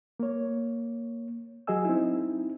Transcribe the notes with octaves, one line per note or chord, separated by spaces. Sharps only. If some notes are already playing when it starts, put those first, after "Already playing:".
A#3 C#5
F#3 F#4 G#4 D#5 G#5 E6
C4 D#4 E4